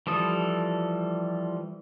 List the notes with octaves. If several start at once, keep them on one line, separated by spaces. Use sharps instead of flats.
E3 F3 G3 A4 D#6